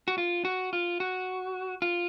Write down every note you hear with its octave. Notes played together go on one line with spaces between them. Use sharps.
F#4
F4
F#4
F4
F#4
F4